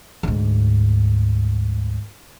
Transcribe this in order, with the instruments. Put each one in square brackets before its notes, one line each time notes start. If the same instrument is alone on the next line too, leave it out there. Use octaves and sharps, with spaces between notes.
[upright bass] D2 G#2